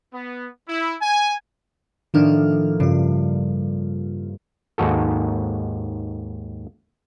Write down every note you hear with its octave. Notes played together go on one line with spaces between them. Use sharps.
B3
E4
G#5
A2 D#3 F3 A#3 D4 F6
G2 C#3 F4
D#2 G#2 D#3 F#4 A4